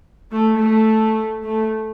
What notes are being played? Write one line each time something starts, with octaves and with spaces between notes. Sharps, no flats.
A3
A3
A3